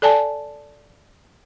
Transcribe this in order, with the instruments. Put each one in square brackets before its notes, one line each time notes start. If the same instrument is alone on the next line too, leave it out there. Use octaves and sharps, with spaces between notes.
[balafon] A4 D5 G#5 A5